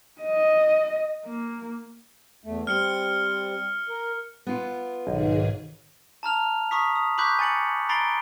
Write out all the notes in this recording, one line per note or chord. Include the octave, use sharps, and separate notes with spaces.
D#5
A#3
E2 A3
G3 C4 F6 C#7 G7
A#4
B3 F4
B1 G#2 D#3 G#4
A5 A#5 F6 F7
A#5 C#6 D#6 B6
D#6
B5 C#6 D6 F#6 G6 B6
G#5 A6 C#7 F#7
A#5 B5 A6 C7 D7 G7